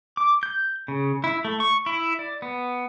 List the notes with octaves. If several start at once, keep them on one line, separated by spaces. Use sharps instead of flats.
D6
G6
C#3
E4
A3
C#6
E4
D5
B3